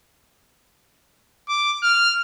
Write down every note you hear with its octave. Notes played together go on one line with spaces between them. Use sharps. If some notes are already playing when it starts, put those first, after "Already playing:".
D6
F6